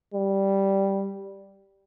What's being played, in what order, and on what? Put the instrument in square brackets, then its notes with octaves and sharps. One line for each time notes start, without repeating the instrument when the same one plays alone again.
[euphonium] G3